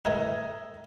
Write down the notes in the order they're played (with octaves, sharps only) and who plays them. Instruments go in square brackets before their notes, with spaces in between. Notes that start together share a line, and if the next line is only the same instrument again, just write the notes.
[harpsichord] A2 A#4 B4 [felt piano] D#5 E5 G#6